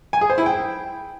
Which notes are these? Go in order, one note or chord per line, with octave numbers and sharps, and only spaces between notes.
G#5
G#4
C5
E4
G5